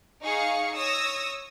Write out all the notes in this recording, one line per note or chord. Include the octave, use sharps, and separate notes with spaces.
D#4 G#4 F5 C#6 C#7
C#5 D#6 E6 A#6